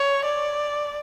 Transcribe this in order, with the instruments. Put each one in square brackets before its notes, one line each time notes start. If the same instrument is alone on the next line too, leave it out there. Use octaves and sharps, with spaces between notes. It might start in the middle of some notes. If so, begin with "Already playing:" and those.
Already playing: [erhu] C#5
D5